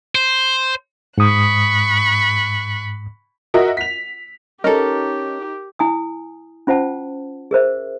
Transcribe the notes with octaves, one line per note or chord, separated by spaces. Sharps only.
C5
G#2 B5 C#6 D#6 F#6
F#4 A#4 D#5 E5 F#5
B6 F7
C#4 D#4 G4 A4 A#4
E4 G#5 D#6
C#4 F4 C5 F#5 A5
G#4 A#4 C5 E5